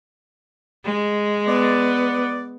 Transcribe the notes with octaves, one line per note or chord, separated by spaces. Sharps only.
G#3
B3 D5